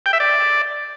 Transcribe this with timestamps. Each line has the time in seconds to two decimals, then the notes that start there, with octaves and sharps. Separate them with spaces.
0.06 G5
0.13 E5
0.20 D5